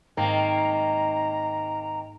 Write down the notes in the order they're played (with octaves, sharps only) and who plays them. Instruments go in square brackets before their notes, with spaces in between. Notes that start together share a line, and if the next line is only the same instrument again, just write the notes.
[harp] G#2 [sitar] D#3 A#3 C4 [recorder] A#5